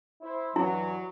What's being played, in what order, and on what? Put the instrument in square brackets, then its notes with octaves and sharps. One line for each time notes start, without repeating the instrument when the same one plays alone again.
[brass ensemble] E4 C5
[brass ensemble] G2 E3 [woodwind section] F#3 [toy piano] E4